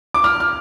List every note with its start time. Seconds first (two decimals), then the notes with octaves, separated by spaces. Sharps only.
0.14 D6
0.24 F6
0.40 F6